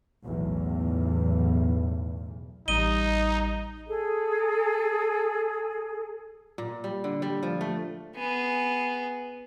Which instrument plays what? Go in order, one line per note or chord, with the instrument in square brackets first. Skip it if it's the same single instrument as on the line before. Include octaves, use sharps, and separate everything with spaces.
[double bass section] B1 E2 A2
[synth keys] A1 G3 [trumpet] D#4 [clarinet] D#5 [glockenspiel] D#7 G7
[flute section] G#4 A4
[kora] A#2
G3
D3
G3
F3
A3
[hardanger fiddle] B3 G#4